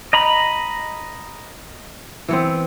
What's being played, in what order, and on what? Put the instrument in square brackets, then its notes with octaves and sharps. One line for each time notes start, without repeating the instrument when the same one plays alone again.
[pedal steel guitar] D#5 A#5 B5
[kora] E3 B3 C4